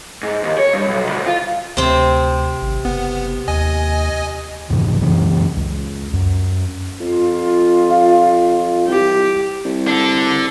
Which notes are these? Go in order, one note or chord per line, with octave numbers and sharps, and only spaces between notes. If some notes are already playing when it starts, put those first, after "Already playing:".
G#2
D#2
C#5
G2
B1
D2
F4
D2 C3 C4
G#1
F#1 B3
D#2 D#5 G#5
F2 G#2 C3 E3
F#2 C#3 E3 C#4
C#2
F#2
F2 F4
F5
C2 G4
C2
D4 A4